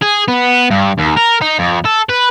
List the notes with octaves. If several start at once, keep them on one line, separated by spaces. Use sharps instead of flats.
G#4
B3
G2
D#2
A#4
D#4
F2
A4
B4